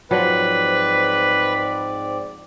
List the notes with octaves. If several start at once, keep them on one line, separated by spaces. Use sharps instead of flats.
G#2 F3 F#3 C4 B4 D5